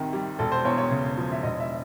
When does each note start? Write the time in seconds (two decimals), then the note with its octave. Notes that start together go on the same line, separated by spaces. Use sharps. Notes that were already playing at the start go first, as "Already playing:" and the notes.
Already playing: C2 C3 D#3
0.13 G3
0.39 E1 A4
0.52 C5
0.65 E2 C#5
0.78 C#5
0.91 C#3
1.17 F3
1.32 E5
1.43 E1 D#5
1.60 E5